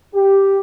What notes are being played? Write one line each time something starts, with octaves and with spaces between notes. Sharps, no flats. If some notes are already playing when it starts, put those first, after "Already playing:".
G4